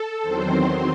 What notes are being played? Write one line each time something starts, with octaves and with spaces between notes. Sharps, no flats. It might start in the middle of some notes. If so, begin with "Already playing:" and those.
Already playing: A4
E2 D#3 F#3 C4 C5